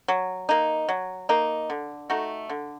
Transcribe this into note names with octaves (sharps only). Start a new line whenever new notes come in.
F#3
A#3 D#4
F#3
A#3 D#4
D3
A3 D#4 F#4
D3